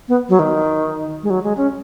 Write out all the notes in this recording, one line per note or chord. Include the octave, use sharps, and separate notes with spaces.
B3
F#3
D#3
G#3
F#3
G#3
C#4